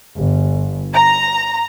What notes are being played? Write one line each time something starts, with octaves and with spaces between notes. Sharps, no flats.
G1
A#5